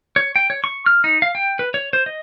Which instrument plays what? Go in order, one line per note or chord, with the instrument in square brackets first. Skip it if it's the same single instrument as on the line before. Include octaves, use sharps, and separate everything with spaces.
[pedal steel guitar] C#5
G5
C#5
C#6
F6
D#4
F5
G5
B4
C#5
C5
D#5